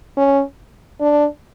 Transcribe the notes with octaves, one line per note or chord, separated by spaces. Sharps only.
C#4
D4